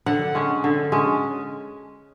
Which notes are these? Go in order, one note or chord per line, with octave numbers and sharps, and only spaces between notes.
D3 F#5
G#3 C#4
D3
G#3 C#4